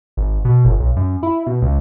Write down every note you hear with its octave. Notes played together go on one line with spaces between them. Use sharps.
G#1
B2
G1
B1
F#2
E4
B2
C#2